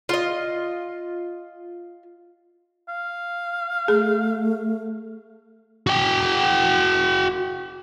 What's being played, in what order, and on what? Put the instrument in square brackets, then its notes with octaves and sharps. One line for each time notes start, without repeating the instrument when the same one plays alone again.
[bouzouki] F4 D#5
[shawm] F5
[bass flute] A3 [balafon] G#4
[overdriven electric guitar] F#4 G5